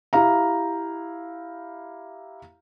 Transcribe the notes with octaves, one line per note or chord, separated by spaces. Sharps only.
E4 G4 F5 A#5